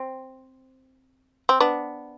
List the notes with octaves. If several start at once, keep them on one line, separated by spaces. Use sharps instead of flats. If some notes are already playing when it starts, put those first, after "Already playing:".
Already playing: C4
C4
B3 D4